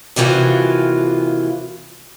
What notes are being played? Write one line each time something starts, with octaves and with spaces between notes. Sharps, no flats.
D#2 C3 E3 F4 F#4 G#5